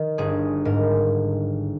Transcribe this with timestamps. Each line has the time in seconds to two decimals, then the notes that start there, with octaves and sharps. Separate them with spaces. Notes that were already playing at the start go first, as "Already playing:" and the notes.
Already playing: D#3
0.18 G1 G#4
0.65 G#2 A#4